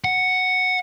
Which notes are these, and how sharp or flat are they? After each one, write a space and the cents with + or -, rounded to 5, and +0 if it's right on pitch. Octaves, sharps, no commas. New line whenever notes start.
F#5 +0